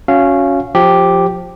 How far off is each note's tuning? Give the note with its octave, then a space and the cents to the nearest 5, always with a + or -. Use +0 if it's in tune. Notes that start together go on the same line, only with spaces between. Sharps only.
C#4 +10 F#4 -15 F5 -20
F3 +15 G4 +0